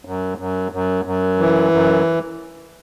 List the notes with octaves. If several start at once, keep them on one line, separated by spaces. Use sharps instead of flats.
F#2
F#2
F#2
F#2
E3
F#2